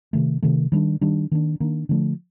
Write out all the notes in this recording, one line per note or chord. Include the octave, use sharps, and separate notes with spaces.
C3 D#3 A3
C3 D#3 A3
D#3 G3 D4
D#3 G3 D4
D#3 A#3 D4
D#3 A#3 D4
D3 F3 A3 D4